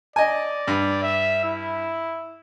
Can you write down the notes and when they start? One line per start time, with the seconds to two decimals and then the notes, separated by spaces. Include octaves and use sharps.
0.16 D5 D#5 G#5
0.67 G2
1.03 E5
1.44 E4